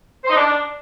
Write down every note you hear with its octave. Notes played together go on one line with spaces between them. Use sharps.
C5
D#4
D4